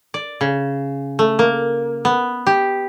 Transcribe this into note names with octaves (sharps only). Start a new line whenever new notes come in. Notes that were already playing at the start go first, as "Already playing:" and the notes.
D5
C#3
A3
A#3
B3
G4